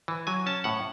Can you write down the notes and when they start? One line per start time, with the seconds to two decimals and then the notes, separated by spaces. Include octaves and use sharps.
0.08 E3
0.27 F#3 G#5
0.46 C#4 A5
0.64 A2 F#5